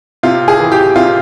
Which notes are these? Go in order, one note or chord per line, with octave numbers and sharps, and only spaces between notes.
C3 F4
G#4
E3
G4
C3 F4